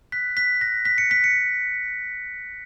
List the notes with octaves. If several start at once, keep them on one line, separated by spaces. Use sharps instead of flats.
F#6 B6
F#6 B6
F#6 A#6
F#6 B6
C#7
F#6 B6
C#7